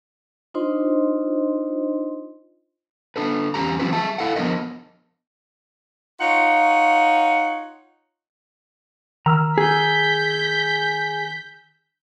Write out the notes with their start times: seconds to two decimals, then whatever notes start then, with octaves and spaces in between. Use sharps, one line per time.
0.54 D4 D#4 F4 C5 D#5 C6
3.16 D4 A4 B4
3.54 E2 C#3 C#4 G4 A#5
3.79 E3 F#3 C4 F4 G4 B4
3.93 G#4 E5 A5
4.18 E4 A4 F5 F#5
4.36 F3 B3 D4 A#4 D#5
6.20 D#4 F4 C#5 F#5
9.26 D#3 A#5 E6 F6
9.58 G#4 G6 B6